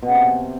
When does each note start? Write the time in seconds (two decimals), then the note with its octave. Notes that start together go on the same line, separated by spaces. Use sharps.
0.03 B2
0.09 C#3
0.15 C3